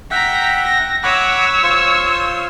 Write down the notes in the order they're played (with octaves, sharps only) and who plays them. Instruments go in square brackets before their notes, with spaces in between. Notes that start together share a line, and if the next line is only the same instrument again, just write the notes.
[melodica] E5 F#5 G5 [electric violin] A#5 B6
[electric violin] A#6
[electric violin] C#5 E6 [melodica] F#5 B5 D6
[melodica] F4 C5